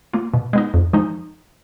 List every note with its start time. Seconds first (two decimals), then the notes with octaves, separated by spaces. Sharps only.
0.13 A#3 F4
0.34 B2
0.53 G#3 B3 D#4
0.74 F2
0.93 F3 G#3 D#4